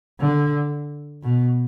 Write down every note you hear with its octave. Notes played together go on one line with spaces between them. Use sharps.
D3
B2